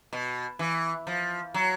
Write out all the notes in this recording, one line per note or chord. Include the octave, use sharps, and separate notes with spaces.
B2
E3
F3
F#3